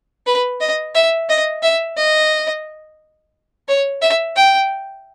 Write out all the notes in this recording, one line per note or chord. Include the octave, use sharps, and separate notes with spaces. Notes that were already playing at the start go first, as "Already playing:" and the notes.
B4
D#5
E5
D#5
E5
D#5
C#5
E5
G5